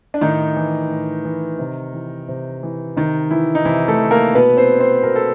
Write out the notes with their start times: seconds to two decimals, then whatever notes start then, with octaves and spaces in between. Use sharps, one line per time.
0.14 D4
0.21 A2 D#3 D#4
0.56 E3
0.90 A2
1.25 E3
1.59 C3
1.94 E3
2.28 C3
2.63 E3
2.96 C3 D#3 D#4
3.31 E3 E4
3.55 D#4
3.65 C3 E3 E4
3.88 A3 A4
4.00 E3
4.11 A#3 A#4
4.34 B2 B3 B4
4.57 C4 C5
4.79 C4 C5
5.02 B2 A#4
5.16 A4